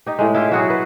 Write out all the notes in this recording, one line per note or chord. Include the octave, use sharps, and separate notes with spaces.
D#4 G4
A2 G#3
E4 F4 G4
F#3 F#4 G#4
B4